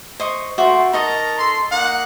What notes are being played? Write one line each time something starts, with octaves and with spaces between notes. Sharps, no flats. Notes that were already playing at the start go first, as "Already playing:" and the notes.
C5 D#5 C#6
A3 F#4 C5 E5 D6
D#4 A#4 D#5 A5 A#5 C#6
A4 C6
A#3 D#4 F#5